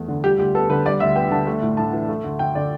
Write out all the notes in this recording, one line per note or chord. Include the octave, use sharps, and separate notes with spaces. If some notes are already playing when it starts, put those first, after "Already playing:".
Already playing: E2 A3
D3
G3 G4
D2 G4
B3 A4
D3 B4
G3 D5
D2 E5
B3 G5
D3 A5
A3
A2
A2 A5
E3
A3
D2
D2 G5
D3 D5